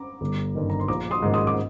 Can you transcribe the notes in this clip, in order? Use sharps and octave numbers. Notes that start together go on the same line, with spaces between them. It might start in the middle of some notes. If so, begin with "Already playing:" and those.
Already playing: A#5 D6
G1
G2 D#3
A#5
C6
A#1 A#5 D6
C6 D#6
G#2 D#3
C6 D#6
D6